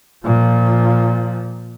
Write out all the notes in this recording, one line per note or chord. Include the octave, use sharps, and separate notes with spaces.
A#2 F3